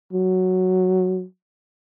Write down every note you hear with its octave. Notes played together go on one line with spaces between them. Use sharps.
F#3